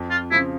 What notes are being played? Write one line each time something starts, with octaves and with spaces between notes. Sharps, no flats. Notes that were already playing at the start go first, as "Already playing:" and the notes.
Already playing: F2
F4
C#3 F3 E4